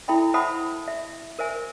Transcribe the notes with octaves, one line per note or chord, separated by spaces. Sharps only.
E4 A4 E5 G5 B5
C5 E5 F#5 A5 B5 D#6
E5
A#4 C5 E5 G#5